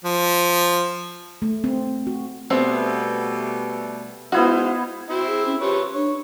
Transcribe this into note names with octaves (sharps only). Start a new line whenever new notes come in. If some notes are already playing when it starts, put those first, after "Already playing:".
F3
A3
C4
F#4
B2 G3 A3 B3 C4 E5
G#3 B3 D#4 E4 F#4 C5 F5
C4 E4 F#4 E5
G#4
C#4
F3 G4 B4 C#5
D4 C#5